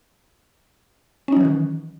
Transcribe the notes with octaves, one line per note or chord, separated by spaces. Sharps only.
D#3 E3 F#3 C#4 D#4